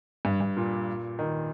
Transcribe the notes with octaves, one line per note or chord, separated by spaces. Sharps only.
G2
G2
A#2
D#3